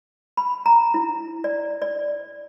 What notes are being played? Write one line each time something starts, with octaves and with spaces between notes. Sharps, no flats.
B5
A#5
E4
D5
D5